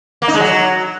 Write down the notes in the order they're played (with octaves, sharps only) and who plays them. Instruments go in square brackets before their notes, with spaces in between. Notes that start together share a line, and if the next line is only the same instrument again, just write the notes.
[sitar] A#3
D#4
G#3
F#3